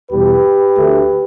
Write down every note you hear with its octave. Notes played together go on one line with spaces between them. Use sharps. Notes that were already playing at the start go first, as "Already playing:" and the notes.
E2 B2 G3 G4 B4
D2 D3 A3